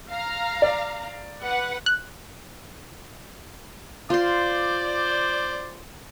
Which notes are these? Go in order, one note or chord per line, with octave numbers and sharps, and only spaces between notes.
F5 A#5
D5
B4 F#5
F#6
F4 C5 D5 C6